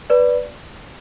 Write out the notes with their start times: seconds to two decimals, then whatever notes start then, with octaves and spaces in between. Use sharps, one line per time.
0.10 B4 D5